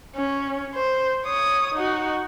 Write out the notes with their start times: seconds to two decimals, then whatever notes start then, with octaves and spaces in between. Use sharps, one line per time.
0.16 C#4
0.74 C5
1.25 C#5 D#6
1.75 D#4 F#4